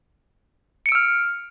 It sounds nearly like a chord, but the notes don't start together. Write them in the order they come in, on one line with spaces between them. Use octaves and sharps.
C#7 D7 E6 F6